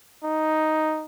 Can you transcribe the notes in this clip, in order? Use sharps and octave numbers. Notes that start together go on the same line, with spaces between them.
D#4